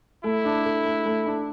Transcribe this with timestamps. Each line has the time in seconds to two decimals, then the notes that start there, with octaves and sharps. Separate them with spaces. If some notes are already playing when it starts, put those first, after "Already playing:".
0.24 A3 E4
0.45 D4
0.65 A4
0.85 A3
1.05 A3
1.26 D4